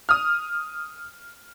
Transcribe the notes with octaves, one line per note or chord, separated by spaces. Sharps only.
D#6 F6